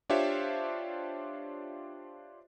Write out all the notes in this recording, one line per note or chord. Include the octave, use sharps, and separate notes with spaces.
D4 F4 G4 C5 C#5 E5